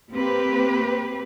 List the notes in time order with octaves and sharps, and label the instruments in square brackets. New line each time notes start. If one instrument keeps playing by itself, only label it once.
[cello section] A#3 C4 G4 B4